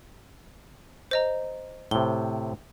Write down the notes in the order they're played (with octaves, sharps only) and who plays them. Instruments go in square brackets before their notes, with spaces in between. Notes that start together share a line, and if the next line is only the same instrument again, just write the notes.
[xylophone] C5 D#5 A#5
[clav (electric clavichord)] A2 C3 [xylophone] G7